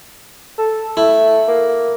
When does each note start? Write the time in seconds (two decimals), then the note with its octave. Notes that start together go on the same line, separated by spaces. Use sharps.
0.58 A4
0.97 A3 E4
1.48 A#3